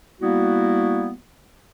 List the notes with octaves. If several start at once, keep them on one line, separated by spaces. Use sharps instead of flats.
G3 A#3 B3 E4 F#4